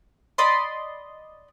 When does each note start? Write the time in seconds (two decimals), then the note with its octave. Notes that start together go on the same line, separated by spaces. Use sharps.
0.38 D5 D#5 B5 C6